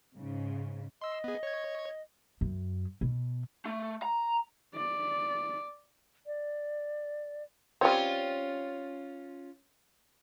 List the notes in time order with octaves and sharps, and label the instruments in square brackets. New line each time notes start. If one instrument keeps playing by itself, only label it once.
[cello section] G#2 C#3
[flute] D#5 [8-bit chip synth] C6 E6
[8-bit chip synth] B3 G#4
C#5 G#6
[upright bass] F#2
B2
[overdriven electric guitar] A3
A#5
[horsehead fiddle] D5
[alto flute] D5
[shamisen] G3 C4 [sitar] C#4 F4 C#5